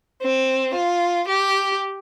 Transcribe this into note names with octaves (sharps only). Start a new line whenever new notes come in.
C4
F4
G4